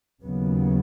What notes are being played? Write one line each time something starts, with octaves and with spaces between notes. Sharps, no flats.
D#2 C#3 F#3 B3